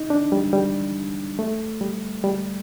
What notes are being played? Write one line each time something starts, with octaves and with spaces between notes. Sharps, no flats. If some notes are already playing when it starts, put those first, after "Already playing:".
Already playing: D#4
D4
G3
G3
A3
G3
G3